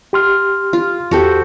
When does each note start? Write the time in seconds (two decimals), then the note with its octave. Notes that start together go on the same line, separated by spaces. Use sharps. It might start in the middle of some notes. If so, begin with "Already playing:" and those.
0.13 G4 C6 F6
0.73 F4
1.11 E2 F#4 G4 A4 C5